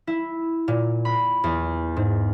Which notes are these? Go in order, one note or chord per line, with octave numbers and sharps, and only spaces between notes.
E4
A#2
B5
E2
G#2